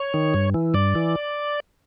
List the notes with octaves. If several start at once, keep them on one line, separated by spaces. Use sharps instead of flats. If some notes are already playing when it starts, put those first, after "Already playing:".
Already playing: C#5
D#3
G2
E3
G2 D5
E3